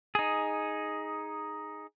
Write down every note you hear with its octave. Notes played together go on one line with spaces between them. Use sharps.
D#4 G#4